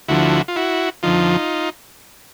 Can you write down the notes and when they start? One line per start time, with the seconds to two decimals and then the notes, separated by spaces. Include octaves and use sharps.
0.08 D2 D3 F3 E4 F#4
0.48 F4
0.56 E4 F#4
1.03 F2 D3 F3 D#4 F4